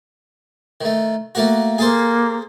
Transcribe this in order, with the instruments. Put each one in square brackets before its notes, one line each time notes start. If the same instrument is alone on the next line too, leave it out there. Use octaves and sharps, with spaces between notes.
[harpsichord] D#3 A3
A3 A#3 F#4
[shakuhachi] A#3 [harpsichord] G#4 A4 C5